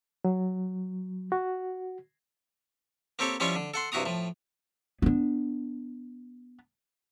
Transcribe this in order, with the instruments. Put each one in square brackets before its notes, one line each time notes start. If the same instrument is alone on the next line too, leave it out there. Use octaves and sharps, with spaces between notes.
[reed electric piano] F#3
F#4
[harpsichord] A#3 C4 G4 A4 C#5
F3 G3 C#4 E4 F4 C#5
D3
A4 F#5 C6
G2 C3 E4 F#4 A#5 D#6
A2 F3
[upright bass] B3 D4